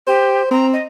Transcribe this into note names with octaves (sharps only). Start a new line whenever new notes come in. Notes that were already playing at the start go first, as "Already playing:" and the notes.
G4 C5
C4 A#5
D#5